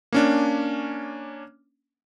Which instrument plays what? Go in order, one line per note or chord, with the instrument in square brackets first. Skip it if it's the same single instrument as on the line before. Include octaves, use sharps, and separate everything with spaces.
[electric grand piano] A#3 C#4 D4